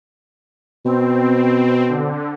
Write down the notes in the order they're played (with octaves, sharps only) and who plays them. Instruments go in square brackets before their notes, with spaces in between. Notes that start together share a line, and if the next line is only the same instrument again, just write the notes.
[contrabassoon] B2 [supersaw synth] C4
[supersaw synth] D3